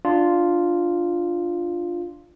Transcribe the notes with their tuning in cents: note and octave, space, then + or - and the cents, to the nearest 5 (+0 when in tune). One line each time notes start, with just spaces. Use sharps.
D4 +10 F4 +0